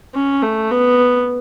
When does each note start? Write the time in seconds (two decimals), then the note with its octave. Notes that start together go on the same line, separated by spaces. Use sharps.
0.14 C#4
0.42 A3
0.70 B3